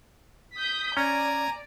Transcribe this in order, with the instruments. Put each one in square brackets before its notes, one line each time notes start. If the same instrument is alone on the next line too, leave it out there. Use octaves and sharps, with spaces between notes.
[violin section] D#6 G6 B6
[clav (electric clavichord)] C#4 [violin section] D5 [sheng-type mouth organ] G#5 A#5